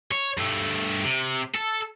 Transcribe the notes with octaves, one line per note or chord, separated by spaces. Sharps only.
C#5
G2 A3
C3
A4